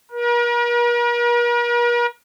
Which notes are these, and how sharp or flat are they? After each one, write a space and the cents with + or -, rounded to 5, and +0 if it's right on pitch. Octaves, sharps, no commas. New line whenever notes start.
A#4 +45